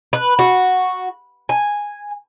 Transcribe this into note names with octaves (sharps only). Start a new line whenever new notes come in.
B4
F#4
G#5